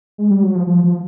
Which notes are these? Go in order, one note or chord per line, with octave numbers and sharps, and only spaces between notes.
G#3
G3
F#3
F3
F3
F3